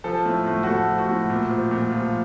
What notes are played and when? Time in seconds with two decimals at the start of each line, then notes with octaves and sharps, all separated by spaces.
0.04 F3 A4
0.25 A2
0.46 A2
0.63 F#4
0.67 A2 A4
0.88 F3
0.98 F#4
1.09 A2
1.30 A#2
1.50 F3
1.71 A#2
1.92 F3 F4